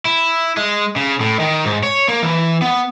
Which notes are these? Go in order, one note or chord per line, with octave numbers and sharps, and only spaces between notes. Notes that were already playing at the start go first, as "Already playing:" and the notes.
E4
G#3
C#3
A2
D#3
G#2
C#5
A#3
E3
B3